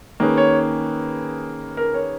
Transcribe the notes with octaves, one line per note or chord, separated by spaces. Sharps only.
D#3 A#3 C#4 G#4 B4
C#5
A#4
C#5